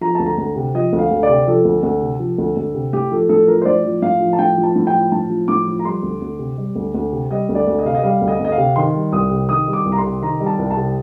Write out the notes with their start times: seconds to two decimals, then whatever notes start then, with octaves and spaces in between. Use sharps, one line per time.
0.01 F3 A#5
0.15 D2 A5
0.26 A#5
0.38 D2
0.56 C3
0.74 F3 D#5
0.93 D2
0.99 F5
1.11 D2
1.23 D5
1.29 C3
1.47 F3 A4
1.65 D2
1.83 D2
2.02 C3
2.20 F3
2.38 D2
2.57 D2
2.74 C3
2.93 A2 G4
3.12 F3 A4
3.29 A2 A4
3.48 F3 A#4
3.62 C5
3.66 A2 D5
3.84 F3
4.02 A2 F5
4.20 F3
4.33 A5
4.39 A2 G5
4.58 F3
4.63 A5
4.76 A2
4.87 G5
4.93 F3
5.12 A2 A5
5.30 F3
5.48 A2 D6
5.67 F3
5.79 A#5
5.85 G3 C6
6.03 D2
6.22 D2
6.39 C3
6.58 G3
6.76 D2
6.95 D2
7.12 C3
7.30 G3 D#5
7.49 D2
7.55 D5
7.67 D2
7.79 D#5
7.85 C3 F5
7.95 D#5
8.03 G3 F5
8.22 D2
8.28 D#5
8.40 D2 D#5
8.52 F5
8.58 C3
8.76 D#3 C6
8.95 G3
9.12 C2 D#6
9.31 C3
9.49 D#3 D#6
9.68 G3
9.73 D6
9.86 C2
9.92 A#5
9.98 C6
10.04 C3
10.22 D#3 A#5
10.40 G3
10.46 A5
10.59 C2
10.71 A5
10.77 C3